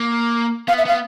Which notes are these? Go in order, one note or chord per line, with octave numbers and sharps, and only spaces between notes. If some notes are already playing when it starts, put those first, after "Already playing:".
Already playing: A#3
B3 F5
E5
B3 F5